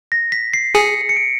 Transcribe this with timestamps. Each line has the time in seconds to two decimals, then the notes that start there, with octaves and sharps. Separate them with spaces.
0.12 A#6
0.32 B6
0.54 C7
0.74 G#4 C#7
1.09 C#7
1.17 D7